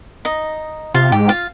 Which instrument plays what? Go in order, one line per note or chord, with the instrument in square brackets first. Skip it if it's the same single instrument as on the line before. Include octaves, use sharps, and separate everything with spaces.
[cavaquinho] D#4 D#5
[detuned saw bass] C3 [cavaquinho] F4 F5
[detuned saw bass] G#2 [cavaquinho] G4 G5
[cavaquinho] F4 F5